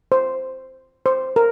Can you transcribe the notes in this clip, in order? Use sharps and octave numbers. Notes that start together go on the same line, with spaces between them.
C5
C5
A#4